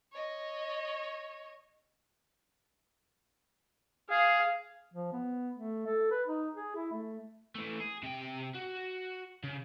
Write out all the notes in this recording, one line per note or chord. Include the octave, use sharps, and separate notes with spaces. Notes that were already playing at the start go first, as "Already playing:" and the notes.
C#5 D#5
G#4 F5
F3
B3
A3
A4
B4
D#4
G#4
E4
A3
E3 A3
G#4
C3 G5
F#4
C#3